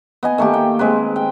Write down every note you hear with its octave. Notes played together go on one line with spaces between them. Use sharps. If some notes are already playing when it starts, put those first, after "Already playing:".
B3 D#5 G#5
D#3 A3 A#3 G4
G5
G#3 C4 B4
G5